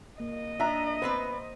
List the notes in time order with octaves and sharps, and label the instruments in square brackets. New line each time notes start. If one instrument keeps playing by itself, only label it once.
[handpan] A#3 [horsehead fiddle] D#5
[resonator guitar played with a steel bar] D4 [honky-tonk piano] E5 A#5
[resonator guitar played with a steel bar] B3 C4 B4 [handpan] C5